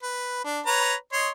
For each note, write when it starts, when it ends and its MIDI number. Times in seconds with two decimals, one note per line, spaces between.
0.03 0.43 71
0.44 0.60 62
0.66 0.94 71
0.66 0.94 73
0.66 0.94 82
1.13 1.29 73
1.13 1.29 75
1.13 1.29 84